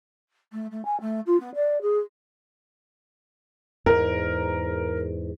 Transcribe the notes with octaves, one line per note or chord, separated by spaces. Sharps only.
A3
A3
G#5
A3
F4
B3
D5
G#4
E2 G#2 A#4